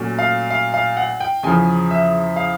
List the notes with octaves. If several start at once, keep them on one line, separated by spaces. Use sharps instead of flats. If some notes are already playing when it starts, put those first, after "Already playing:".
Already playing: A#2 F#3 A3 C#4
F5
F5
F5
F#5
G5
E2 C#3 F3 G#5
E5
F5